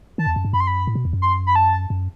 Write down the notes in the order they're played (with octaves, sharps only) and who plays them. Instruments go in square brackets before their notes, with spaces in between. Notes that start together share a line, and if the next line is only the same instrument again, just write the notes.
[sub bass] D#3 [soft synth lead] A5
[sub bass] E2
F#2
G2
[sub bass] F#2 [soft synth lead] B5
[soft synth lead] C6
B5
[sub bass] A2
B2
E2
F#2
[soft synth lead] C6
B5
A5
[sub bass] F#2